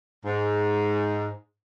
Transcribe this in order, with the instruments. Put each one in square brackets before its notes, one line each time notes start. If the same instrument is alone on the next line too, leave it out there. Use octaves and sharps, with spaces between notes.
[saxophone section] G#2